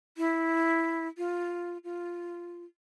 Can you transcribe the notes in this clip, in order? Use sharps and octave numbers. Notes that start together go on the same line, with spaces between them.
E4
F4
F4